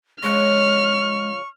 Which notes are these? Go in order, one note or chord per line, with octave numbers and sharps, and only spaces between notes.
C#3 F3 G#3 C#4 C#6 F6